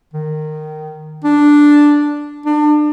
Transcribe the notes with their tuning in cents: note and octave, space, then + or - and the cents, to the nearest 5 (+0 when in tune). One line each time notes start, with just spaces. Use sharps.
D#3 -15
D4 +0
D4 +30